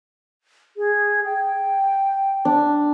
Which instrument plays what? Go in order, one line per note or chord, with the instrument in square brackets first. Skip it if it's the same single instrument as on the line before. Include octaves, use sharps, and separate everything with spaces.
[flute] G#4
G5
[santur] D4